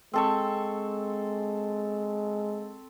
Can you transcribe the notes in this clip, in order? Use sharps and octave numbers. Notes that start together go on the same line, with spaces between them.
G#3 C4 A4 C#6